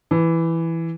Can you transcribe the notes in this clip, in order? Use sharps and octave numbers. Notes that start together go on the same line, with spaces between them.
E3